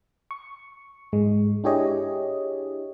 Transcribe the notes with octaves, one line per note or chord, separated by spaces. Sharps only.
C#6
G#2 G#3
D4 E4 G4 G#4 C#5 D#5